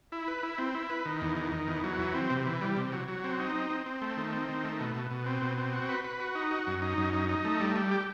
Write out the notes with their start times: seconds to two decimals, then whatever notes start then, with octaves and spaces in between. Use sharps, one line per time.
0.12 E4
0.28 B4
0.43 E4
0.58 C4
0.75 E4
0.90 B4
1.05 D#3
1.21 E2
1.37 D#3
1.52 D#3
1.68 E2
1.84 F#3
1.99 E3
2.14 C4
2.30 C3
2.46 E3
2.61 G3
2.76 C3
2.92 F#3
3.08 F#3
3.24 C4
3.39 D#4
3.55 C4
3.70 C4
3.86 C4
4.02 A3
4.17 D#3
4.33 C4
4.49 D#3
4.64 A3
4.80 B2
4.95 B2
5.11 B2
5.26 C4
5.42 B2
5.58 C4
5.73 F#4
5.89 B4
6.04 B4
6.20 F#4
6.35 D#4
6.51 F#4
6.67 F#2
6.82 D#4
6.98 F#2
7.13 D#4
7.29 D#4
7.45 A3
7.60 G3
7.76 G3
7.91 G4